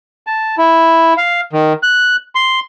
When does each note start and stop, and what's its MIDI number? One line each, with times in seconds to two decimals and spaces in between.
0.27 0.55 81
0.58 1.14 64
1.18 1.41 77
1.53 1.73 51
1.83 2.16 90
2.35 2.60 84